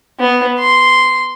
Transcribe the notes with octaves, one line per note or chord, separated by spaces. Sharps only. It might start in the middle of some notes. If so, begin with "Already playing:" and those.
B3
C6